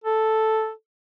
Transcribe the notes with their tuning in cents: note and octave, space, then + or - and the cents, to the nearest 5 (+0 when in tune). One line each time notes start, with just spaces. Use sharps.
A4 +0